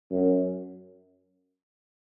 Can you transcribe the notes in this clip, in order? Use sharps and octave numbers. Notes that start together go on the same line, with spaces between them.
F#2